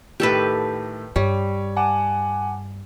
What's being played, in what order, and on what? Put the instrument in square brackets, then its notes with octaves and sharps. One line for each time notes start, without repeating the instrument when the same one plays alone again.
[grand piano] A2 D#3 A3 [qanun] G4 A4 B4
[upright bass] G2 [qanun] G3 [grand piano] C#5
[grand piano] F#5 A5 D6 [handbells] G#5